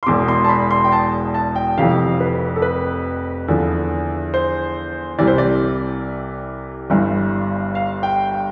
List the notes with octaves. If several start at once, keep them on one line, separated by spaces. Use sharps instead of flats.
C6
E1 E2 B2 D6
C6
A5
B5
C6
G5
A5
A5
G5
F1 F2 C3 E3 F5
B4
A4
B4
E2 D3 F3
C5
C2 C3 E3 D5
C5
D5
G1 G2 E3
F5
G5
G5